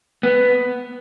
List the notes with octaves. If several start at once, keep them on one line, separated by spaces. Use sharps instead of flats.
B3